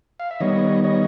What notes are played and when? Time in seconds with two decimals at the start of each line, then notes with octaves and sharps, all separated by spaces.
0.20 F5
0.31 E5
0.40 D#3 G3 B3 C#5 D#5
0.84 C#5 D#5